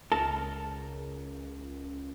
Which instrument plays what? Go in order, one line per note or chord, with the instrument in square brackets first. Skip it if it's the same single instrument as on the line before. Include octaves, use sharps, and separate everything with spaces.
[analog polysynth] C#2 [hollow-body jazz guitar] A#4 A5